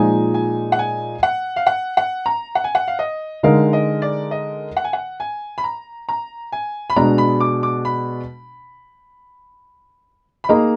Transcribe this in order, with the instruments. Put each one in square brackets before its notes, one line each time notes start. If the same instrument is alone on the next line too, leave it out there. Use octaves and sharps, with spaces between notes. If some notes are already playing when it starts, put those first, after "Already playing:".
Already playing: [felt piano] A#2 F3 G#3 D#4 [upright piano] G#5
[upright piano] G#5
F#5
G#5
F#5
F5
F#5
F#5
A#5
F#5
G#5
F#5
F5
D#5
[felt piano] D3 G#3 D#4 A#4 [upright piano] F5
[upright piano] D#5
D5
D#5
F#5
G#5
F#5
G#5
B5
A#5
A#5
G#5
B5
[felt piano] B2 G#3 D4 [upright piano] A#5
[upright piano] B5
D6
D6
B5
B5
[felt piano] A#3 D#4 G#4 D#5 [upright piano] A#5